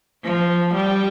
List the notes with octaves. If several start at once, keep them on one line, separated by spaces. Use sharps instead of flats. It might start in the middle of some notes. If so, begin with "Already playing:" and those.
F3
G3